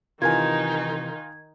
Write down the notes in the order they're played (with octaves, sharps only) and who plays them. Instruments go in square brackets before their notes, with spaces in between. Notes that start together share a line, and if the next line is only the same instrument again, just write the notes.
[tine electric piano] C3 E3 [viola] D#3 D#4 [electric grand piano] F4 A#4 G#5 [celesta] G#6